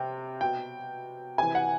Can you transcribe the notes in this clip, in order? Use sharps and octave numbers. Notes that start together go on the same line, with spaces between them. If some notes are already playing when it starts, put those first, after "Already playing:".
Already playing: C3 G5
B2 G5
C3 E3 G#5
F#5